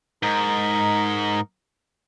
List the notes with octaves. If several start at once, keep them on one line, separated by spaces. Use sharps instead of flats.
G#2 D#4 A#4